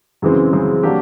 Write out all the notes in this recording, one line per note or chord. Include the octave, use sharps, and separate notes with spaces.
F#2 C#3 E3 G#3 C4
F#2 C#3 E3 G#3 C4
F#3 A#3 D4 G4